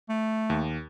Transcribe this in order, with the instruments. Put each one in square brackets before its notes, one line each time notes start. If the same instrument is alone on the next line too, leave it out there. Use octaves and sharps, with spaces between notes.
[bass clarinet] A3
[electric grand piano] D#2